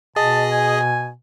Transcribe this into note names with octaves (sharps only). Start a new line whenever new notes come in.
B2 G#4 D#5 A5
G#5